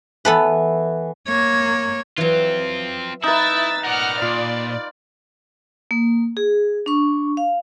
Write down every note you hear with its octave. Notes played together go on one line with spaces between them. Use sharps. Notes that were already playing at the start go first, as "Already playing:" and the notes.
E3 B3 A4 B4
A#3 C#5
E3 F#3 C4 F4
D#4 E4 B4 E5 E6 A6
A#4 D5 F#5 F6
A#2 F4 D5
A#3
G#4
D4 C#6
F5